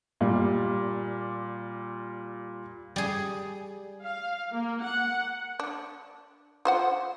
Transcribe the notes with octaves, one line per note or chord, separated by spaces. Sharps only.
A#2 G3
G3 G#4
F5
A#3
F#5
D4
F4 C5 F#5